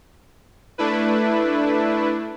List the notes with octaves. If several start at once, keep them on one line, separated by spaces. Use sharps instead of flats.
A3 D4 E4 B4